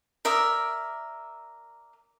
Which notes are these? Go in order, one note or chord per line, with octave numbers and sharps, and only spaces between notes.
A#4 D5 E5 D#6